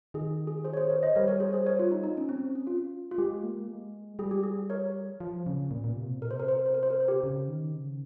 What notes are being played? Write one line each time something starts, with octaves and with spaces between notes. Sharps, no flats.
D#3 G#4
G#4
G#4 C5
C#5
G#4 C5
A#4 C#5
C5 D#5
G3 A#4 C#5
A#4 C#5
G#4 C5
G#4 C5
A#4 C#5
F4
D#4
D#4
C#4
C4
C#4
F4
F4
G#3 G4
A#3
G#3
G3 G#4
G4
G#4
A#4 C#5
F3
C#3
A#2
A#2
C3
A#2
C3 A#4
C5
A#4
C5
A#4
C5
A#4
C5
A#4
C5
G4 A#4
C#3
D#3
C#3